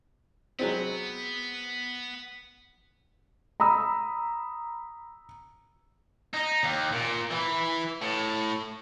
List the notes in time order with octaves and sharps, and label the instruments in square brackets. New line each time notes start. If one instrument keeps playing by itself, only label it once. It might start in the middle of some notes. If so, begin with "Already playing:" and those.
[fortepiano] F#3 G#3 C4 [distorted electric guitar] B3
[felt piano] A#5 B5 D#6 E6
[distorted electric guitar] D#4
D#2
A#2
E3
A2